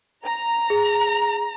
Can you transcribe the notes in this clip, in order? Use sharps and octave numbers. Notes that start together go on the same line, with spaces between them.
A#5
G#4